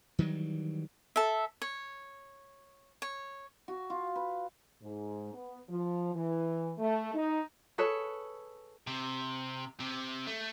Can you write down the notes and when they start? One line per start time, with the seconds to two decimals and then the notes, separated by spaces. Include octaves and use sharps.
0.19 D#3 E3 F#3 G3
1.16 A4 E5
1.62 C#5
3.02 C#5
3.68 F#4
3.90 F4
4.15 B4
4.82 G#2
5.33 B3
5.69 F3
6.14 E3
6.78 A3
7.14 D#4
7.78 G#4 A4 B4 C#5
8.87 C3
9.80 C3
10.27 A3